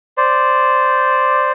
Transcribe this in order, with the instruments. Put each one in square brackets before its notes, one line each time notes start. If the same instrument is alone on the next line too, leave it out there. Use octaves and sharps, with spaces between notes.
[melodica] C5 D5